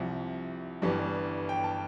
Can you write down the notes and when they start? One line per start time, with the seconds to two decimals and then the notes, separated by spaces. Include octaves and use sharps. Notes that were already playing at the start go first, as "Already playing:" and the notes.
Already playing: C2 C3 F3
0.82 G1 G2 E3 G3
1.49 G5
1.64 A5